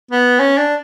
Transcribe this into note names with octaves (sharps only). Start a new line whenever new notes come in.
B3
C#4
D4